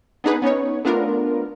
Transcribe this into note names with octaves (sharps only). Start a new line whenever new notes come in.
B3 D4 D#4 G#4 B4
B3 C#4 D#4 C#5
A3 B3 D4 F4 A#4